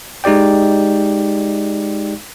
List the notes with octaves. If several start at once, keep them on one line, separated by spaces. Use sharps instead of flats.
G#3 D#4 G4 D5 G5